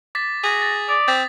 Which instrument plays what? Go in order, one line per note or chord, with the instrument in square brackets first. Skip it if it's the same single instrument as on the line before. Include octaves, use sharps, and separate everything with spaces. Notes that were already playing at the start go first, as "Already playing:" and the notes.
[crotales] D6 A6 B6
[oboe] F#4 [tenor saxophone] G#4 [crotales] B6
[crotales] A6
[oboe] D5 [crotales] D#6
[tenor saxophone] C4 [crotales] A6 B6